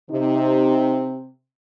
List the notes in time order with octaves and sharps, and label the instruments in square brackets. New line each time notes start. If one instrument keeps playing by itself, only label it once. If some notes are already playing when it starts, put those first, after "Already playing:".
[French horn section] C3 [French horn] D#4